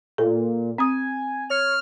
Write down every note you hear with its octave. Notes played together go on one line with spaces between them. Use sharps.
A#2 A4
C4 G#5 D#6
C#5 F6